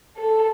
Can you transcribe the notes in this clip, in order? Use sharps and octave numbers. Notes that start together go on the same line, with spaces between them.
A4